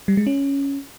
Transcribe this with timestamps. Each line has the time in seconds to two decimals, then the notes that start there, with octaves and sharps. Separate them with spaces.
0.08 G3
0.17 G#3
0.27 C#4